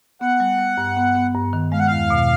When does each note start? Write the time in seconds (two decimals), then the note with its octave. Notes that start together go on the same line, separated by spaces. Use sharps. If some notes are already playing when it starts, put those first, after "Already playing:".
0.21 B3 F#5
0.40 G3
0.59 G3
0.78 G2
0.97 B3
1.15 B3
1.34 G2
1.53 D#3
1.72 G#3 F5
1.79 F#5
1.87 E2 F5
2.10 B2